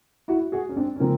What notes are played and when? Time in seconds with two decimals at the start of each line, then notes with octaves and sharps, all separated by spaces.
0.28 E4 F#4
0.52 F#4 G#4
0.69 C#4
0.76 C4 D4
0.96 C#4
1.00 C#3 F3 A#3 C4